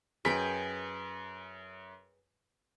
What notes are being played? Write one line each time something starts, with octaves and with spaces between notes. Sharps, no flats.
F#2 G#4 B4 G5 B6